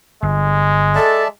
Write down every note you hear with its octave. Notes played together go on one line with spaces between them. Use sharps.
G1 G#3
A4 D5 E5 A5